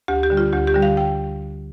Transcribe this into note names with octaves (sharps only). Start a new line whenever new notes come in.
D2 G4
G4
D3 G3
F4
D2 G4
G4
D3 G3
F5
G5